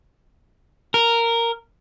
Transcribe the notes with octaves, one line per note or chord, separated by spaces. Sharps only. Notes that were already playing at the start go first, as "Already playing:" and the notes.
A#4